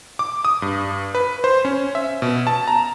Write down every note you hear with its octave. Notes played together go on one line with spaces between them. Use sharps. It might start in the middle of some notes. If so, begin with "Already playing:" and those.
D6
D#6
G2
B4
C5
C#4
E5
B2
A5
A#5